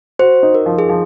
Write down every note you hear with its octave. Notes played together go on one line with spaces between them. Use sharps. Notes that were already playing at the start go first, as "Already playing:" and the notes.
F#4 C5
D#4
A#4
F3
G#4
F3